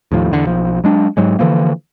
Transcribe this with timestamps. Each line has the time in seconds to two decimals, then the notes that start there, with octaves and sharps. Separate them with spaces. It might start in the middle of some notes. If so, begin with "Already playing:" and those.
0.12 D#2 A2 F3
0.31 E2 D3
0.46 B1 F3
0.84 F#3 G#3 D4
1.17 G#2 F#3 G#3
1.39 D3 E3 F3 A#3